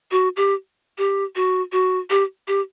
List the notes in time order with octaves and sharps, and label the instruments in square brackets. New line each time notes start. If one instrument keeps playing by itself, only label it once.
[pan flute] F#4
G4
G4
F#4
F#4
G4
G4